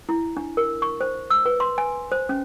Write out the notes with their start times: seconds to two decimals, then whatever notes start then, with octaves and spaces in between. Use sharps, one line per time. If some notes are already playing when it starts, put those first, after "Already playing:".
0.09 E4
0.37 D4
0.57 A#4
0.82 C#6
1.01 C5
1.30 E6
1.46 B4
1.60 C6
1.78 G#5
2.12 C5
2.29 C#4